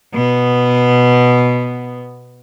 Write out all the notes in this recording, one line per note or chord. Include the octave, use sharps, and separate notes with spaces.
B2 B3